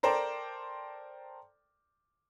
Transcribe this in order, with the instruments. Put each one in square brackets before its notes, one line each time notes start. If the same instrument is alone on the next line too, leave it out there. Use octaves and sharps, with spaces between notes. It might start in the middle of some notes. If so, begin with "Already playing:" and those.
[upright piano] A4 A#4 C5 D5 G5